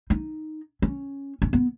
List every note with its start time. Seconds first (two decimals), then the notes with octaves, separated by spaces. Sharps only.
0.10 D#4
0.82 C#4
1.42 C#4
1.53 B3